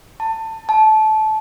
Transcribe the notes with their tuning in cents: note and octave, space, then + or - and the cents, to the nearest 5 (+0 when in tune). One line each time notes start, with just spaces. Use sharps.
A5 +25
A5 -20